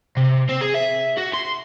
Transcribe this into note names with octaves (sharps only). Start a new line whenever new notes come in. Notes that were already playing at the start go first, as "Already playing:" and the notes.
C3
C4
G#4
E5
F#4
C6